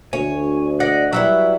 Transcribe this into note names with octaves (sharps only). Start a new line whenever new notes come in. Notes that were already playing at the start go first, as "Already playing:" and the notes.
D2 C#5 G#5
D5 D#5 F#5
F#3 G3 E4 B4 E5 E6